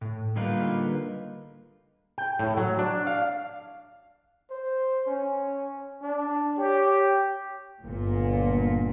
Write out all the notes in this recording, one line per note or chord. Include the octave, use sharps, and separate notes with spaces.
A2
D3 G3 A#3 D#4 F4 B4
G5
A2
F#3
D4
F5
C5
C#4
D4
G4 C#5
G1 A#2